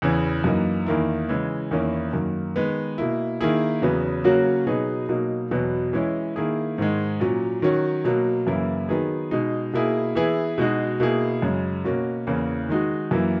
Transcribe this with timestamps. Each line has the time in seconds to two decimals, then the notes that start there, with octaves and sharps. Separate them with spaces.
0.02 E2 C#3 E3
0.44 F#2 E3 A#3 D#4
0.86 E2 D#3 A#3 E4
1.29 C#3 E3 G#3
1.71 E2 D#3 A#3 C#4 E4
2.13 F#2 D#3 A#3
2.56 D#3 G#3 B3
2.98 B2 A#3 E4
3.41 D#3 A#3 E4 G#4
3.82 E2 C#3 F#3 B3
4.24 C#3 F#3 A#3 C#4 F#4
4.67 B2 F#3 B3 D#4 G#4
5.09 B2 F#3 A#3 D#4
5.51 E2 B2 F#3 B3
5.93 E3 G#3 C#4 E4
6.36 D#3 A#3 E4 G#4
6.78 G#2 D#3 G#3
7.20 A#2 F#3 C#4
7.62 D#3 F#3 C#4 F#4
8.05 B2 F#3 A#3
8.47 F#2 C#3 E3 A#3 E4
8.89 D#3 F#3 B3 D#4 G#4
9.31 B2 G#3 D#4
9.73 B2 A#3 E4 G#4
10.15 E3 B3 E4 G#4
10.58 B2 G#3 D#4 F#4
11.00 B2 A#3 E4 G#4
11.42 F#2 C#3 G#3
11.84 B2 A#3 C#4 F#4
12.27 E2 C#3 E3 A#3
12.69 D#3 G#3 D#4 F#4
13.11 F#2 E3 A#3 E4